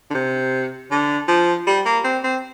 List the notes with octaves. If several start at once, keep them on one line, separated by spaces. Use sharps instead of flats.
D3
C3
D3
F3
G3
A#3
C4
C4